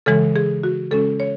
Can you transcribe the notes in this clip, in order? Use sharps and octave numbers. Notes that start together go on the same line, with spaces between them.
C#3 E3 G#3 A4
G#4
F#4
C#3 G#3 C#4 A4
C#5